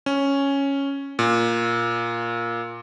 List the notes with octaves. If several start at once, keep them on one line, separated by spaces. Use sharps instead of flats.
C#4
A#2